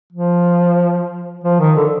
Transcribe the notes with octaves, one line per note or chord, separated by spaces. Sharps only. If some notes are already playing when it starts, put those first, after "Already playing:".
F3
F3
D#3
D3